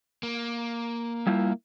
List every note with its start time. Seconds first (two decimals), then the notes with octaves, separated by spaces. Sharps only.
0.23 A#3
1.27 G3 E4 F4